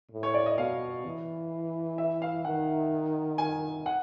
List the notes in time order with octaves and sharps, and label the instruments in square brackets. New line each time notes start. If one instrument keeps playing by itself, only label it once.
[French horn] A2
[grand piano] C#5
D5
D#5
[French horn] B2 [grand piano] F5
[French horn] E3
[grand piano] E5
F5
[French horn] D#3 [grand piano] F#5
[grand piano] G#5
F#5